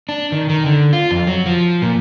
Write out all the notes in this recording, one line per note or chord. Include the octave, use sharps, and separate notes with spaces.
D4
D#3
D#3
D3
F4
F2
F#3
F3
A#2